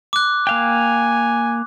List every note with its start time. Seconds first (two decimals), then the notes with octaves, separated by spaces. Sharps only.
0.13 D6 F#6
0.47 A#3 F5 G5 G#5